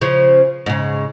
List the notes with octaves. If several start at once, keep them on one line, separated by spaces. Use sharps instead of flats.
C#3 F3
G#2 C#3